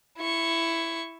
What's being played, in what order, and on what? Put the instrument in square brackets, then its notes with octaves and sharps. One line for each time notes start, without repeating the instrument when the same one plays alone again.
[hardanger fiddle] E4 C#6